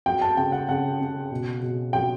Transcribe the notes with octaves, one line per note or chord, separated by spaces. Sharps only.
F#3 G5
A5
C#3 G5
F#5
C#3 F#5
C#3
B2
B2
F#3 G5